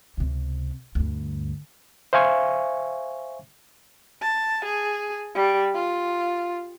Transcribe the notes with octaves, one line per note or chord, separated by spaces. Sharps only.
C#2 C3
D2 G2
C5 E5 F5 G#5 C#6
A5
G#4
G3
F4